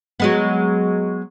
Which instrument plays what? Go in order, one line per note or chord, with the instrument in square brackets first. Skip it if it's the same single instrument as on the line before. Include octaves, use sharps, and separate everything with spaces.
[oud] F#3 G#3 B3